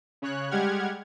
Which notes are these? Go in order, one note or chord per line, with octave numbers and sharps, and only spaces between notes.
C#3 C#5 F#6
G3 G#3 G4 F#5 F6 G#6